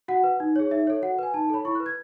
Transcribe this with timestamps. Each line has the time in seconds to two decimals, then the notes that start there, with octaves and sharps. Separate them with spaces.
0.08 F#4 F#5
0.24 B4
0.40 D#4
0.56 G#4 C#5
0.71 D#4 E5
0.87 A4 C#5
1.02 F#4 F#5
1.19 B4 G#5
1.34 D#4 A5
1.44 A5
1.50 A4 C#5 B5
1.65 E4 C#6
1.75 F#6
1.80 B4
1.86 G#6